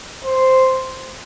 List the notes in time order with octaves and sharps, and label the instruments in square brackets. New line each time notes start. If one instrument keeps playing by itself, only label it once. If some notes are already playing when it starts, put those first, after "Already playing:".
[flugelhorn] C5